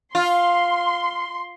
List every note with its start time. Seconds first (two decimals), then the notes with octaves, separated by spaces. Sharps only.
0.15 F4 C6